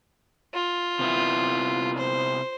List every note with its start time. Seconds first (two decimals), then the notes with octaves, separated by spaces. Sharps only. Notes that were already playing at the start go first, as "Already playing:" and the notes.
0.54 F4
0.99 C3 B3 E4
1.98 C5